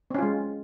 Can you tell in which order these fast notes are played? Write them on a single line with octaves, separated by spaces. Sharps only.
C4 C#4 F4 G#3